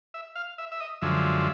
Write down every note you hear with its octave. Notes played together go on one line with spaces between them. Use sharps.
E5
F5
E5
E5
D#5
F#2 D3 F3 G#3 E5